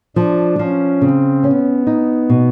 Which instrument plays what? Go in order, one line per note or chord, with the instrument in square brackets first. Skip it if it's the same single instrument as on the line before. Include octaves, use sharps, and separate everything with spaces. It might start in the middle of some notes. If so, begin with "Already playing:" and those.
[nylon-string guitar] F3 [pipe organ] D4
[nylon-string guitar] F3 [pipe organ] C#4
[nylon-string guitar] C#3 [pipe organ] C4
[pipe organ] B3 [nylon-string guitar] C#4
[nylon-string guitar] D#4
B2